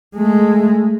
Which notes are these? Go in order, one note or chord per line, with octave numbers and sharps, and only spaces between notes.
G#3 A3